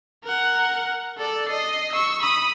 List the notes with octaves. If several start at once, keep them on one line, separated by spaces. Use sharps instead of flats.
A#4 F#5
A4 D5
D#5 C7
C#6 E6
B5 D#6